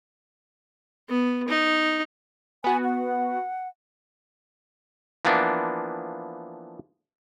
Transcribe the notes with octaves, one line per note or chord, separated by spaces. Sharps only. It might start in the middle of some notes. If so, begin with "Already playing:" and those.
B3
D#4
B3 F#4 G#5
F#5
E3 F3 A#3 B3 D4